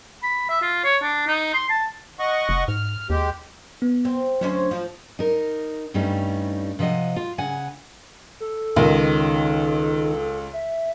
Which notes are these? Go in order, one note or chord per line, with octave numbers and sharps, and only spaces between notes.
B5
E5
F4
C#5
D4
D#4
C6
A5
D#5 F#5 C#6
F1
G#2 F6
D#2 G#3 G4
B3
C4
D2 F#3 C#4 C5 C6
F3
D#4 A#4
G2 G3 A3 C#4 D#4
C3 F3 B4 D#5 F#5
F4
C#3 F#5 G#5
A4
C#2 D#3
E5